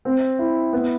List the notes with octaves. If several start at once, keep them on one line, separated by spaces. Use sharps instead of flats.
C4
E4
B3